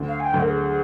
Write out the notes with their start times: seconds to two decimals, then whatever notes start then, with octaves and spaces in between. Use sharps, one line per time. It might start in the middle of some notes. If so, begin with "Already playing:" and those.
Already playing: D2
0.08 F5
0.20 G#5
0.24 G5
0.34 D2
0.40 A#4
0.47 G#4